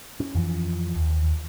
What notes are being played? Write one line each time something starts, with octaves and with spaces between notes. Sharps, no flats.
C#4
F2 E3 F3
D#2